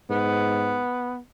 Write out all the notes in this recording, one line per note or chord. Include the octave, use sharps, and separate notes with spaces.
G#2 B3